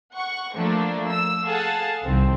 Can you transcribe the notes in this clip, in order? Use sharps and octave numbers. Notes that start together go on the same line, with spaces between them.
F#5 C#6
F3 A3 A#3 D4
E6
G#4 A4 F5 F#5 A5
C2 D#3 C4